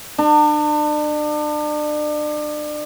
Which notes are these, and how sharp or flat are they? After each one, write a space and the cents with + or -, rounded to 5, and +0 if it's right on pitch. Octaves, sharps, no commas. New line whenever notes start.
D4 +35